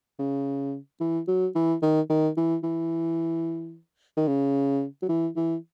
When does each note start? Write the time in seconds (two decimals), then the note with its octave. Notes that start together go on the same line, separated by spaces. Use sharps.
0.19 C#3
1.01 E3
1.28 F#3
1.55 E3
1.82 D#3
2.10 D#3
2.37 E3
2.64 E3
4.17 D#3
4.27 C#3
5.02 F#3
5.09 E3
5.36 E3